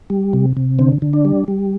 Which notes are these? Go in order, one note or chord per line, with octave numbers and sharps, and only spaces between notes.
G3
C3
C3
D3 C4
D3
D4
G3
G3